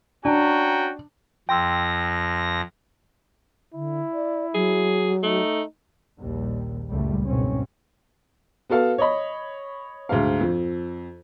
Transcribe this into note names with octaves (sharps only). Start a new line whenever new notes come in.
C#4 D4 F#4 G5 A#5
F2 G5 C6 E6 A#6
D3 E4
D5
F#3 G#4
A3 D#4
A#1 D#2 G3
F#1 C#2 A#2 G3 A3
F#1 C#2 G#2 B2 C4 C#4
B3 F#4 A4 F5 A5
C#5 D#5 B5
D2 G#2 F5
F2